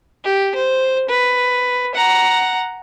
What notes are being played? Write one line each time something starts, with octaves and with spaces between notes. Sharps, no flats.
G4
C5
B4
F#5 A#5